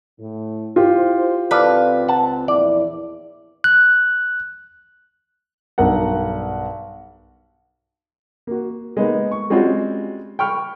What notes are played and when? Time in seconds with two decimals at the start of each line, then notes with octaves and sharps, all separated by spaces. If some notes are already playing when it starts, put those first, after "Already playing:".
0.19 A2
0.76 E4 F4 G4 C5
1.51 C#2 C4 A4 B4 D5 F5
2.09 F#5 A5
2.48 A#1 E2 E4 D5
3.64 F#6
5.78 B1 G2 A#4 F#5
8.47 A#3 F#4
8.97 G#3 A#3 B3 D#4
9.32 C#6
9.50 G3 G#3 C4 C#4 F4 F#4
10.39 G5 B5 C#6 F6